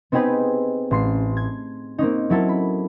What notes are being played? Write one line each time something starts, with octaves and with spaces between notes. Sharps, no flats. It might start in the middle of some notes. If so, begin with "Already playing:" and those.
B3 C4 D#4 G4 G#4 B4
A1 C6 C7
G#6
A#3 C4 C#4 D#4
F#3 E4 A4 A#4
B5